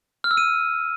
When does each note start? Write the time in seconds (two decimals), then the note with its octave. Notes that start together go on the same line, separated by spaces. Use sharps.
0.24 F6
0.31 E6
0.37 D#7